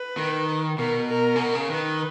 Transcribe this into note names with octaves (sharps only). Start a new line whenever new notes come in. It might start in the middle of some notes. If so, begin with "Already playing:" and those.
Already playing: B4
D#3
B2 A#4
A#4
C#3
B2
C#3
D#3 B4